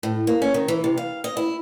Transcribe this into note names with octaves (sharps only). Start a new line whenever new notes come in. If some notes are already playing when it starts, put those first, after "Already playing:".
A2
A#3
C#4
D#3
E3
C3
F5
D#5
E4